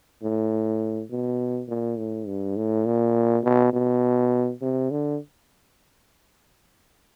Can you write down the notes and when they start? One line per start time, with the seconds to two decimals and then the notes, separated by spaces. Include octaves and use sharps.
0.23 A2
1.11 B2
1.69 A#2
1.98 A2
2.27 G2
2.57 A2
2.86 A#2
3.44 B2
3.73 B2
4.62 C3
4.91 D3